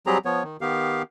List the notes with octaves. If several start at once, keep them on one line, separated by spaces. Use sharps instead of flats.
F#3 G3 C4 G4 G#4 A#5
F3 B3 C#5
D#3
D#3 B3 G4 F5